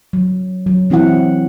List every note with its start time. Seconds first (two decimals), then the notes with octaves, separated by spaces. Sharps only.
0.13 F#3
0.67 F#3
0.90 E3 C4 E4 F#4 F#5